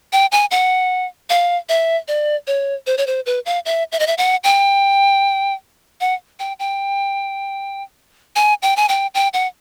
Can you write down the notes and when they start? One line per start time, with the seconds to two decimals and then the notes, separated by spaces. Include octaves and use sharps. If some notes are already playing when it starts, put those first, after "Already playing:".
0.13 G5
0.32 G#5
0.51 F#5
1.30 F5
1.69 E5
2.08 D5
2.47 C#5
2.87 C5
2.98 C#5
3.07 C5
3.26 B4
3.46 F5
3.65 E5
3.92 E5
3.99 D#5
4.07 E5
4.18 F#5
4.44 G5
6.01 F#5
6.39 G5
6.59 G5
8.36 G#5
8.62 G5
8.76 G#5
8.89 G5
9.14 G5
9.34 F#5